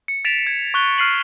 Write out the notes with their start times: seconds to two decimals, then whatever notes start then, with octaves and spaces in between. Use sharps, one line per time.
0.08 C#7
0.25 A6 B6 D7 E7 F7
0.47 G#6
0.74 C#6 F#6 G7
0.98 F6 F#6 C7 D#7 F#7